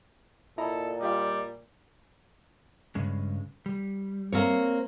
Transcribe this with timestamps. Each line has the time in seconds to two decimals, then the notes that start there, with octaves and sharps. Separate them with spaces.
0.58 A#2 E4 A4 D#5 A#5
1.01 G3 F4 G4 D#5
2.95 G2 C#3 G#3
3.66 G3
4.32 A#3 C4 C#5